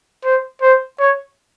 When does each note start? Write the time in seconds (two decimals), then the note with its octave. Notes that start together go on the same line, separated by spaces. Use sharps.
0.24 C5
0.62 C5
0.99 C#5